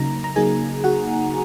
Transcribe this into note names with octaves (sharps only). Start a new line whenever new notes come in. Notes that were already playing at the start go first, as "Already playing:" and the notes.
Already playing: C#3 F#3 A#3 D#4 A#5
A#5
C#3 F#3 A#3 D#4 G#4 G#5
C#3 F#4 F#5